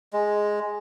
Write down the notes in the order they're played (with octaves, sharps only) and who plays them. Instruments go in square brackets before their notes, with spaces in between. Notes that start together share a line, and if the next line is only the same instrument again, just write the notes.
[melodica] G#3